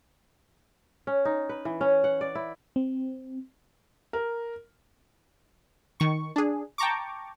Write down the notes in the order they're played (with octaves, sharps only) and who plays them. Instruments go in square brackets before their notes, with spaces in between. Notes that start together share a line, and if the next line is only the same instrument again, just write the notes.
[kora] C#4
D#4
B4
E3
C#4
F#5
D5
E4
[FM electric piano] C4
[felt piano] A#4
[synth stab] D#3 C#6
D4 G#4
G5 A5 A#5 C#6 D6